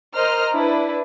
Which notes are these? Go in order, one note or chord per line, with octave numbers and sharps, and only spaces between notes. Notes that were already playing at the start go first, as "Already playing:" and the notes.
A#4 C5 D#5 A#5 F6
D4 E4 B4